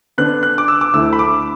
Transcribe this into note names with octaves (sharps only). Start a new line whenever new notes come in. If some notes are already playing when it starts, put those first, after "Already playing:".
D3 B3 D4 F#6
F#6
D6
E6
D6
D2 D3 A3 E4 E6
B5
D6